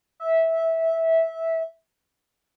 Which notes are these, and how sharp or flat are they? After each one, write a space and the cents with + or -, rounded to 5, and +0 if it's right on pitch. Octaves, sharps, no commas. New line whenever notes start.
E5 -15